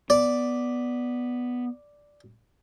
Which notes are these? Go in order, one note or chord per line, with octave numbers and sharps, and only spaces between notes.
B3 D5